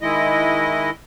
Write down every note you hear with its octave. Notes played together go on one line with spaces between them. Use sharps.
D#3 G#3 E4 D#5